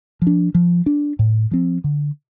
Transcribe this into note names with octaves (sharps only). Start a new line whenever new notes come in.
F3
D4
F3
D4
A2
F3 C4
D3